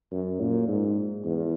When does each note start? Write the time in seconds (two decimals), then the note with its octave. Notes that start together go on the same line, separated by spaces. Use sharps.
0.12 F#2
0.40 A#2
0.68 G#2
1.25 E2